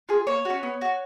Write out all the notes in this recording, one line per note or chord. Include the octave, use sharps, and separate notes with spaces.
F4 G#4
A#3 C#5
C#4 F#4
B3
F#4